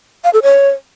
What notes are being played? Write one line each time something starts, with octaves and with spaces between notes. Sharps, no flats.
F5
A4
C#5